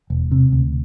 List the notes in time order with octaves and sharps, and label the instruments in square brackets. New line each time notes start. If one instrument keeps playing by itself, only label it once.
[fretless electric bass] E1
C3
D2